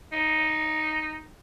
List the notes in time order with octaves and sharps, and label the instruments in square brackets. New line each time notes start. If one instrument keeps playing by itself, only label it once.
[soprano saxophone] D#4